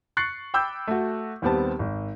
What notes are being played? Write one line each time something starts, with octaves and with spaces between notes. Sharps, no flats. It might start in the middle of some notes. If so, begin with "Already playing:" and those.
C#6 F#6 A6 C7 C#7
G5 B5 D6 E6 G6
A3 F#4
D#2 G3 B3 C4 A5
G#1